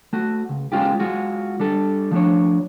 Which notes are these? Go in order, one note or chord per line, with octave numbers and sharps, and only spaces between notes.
A3 F#4
C#2
G#3 A3 C#4 F4 G4
G#3 F4 F#4
G3 D4 A4
F3 A3 D4 C#5